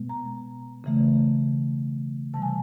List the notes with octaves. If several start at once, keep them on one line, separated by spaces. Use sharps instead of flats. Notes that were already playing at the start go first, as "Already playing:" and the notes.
Already playing: B2 G#3 B3
A#5
C#3 E3 A3
C3 E3 G3 A5
G#5